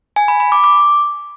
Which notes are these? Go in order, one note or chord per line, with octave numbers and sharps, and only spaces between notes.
G#5
B5
B5
D6
D6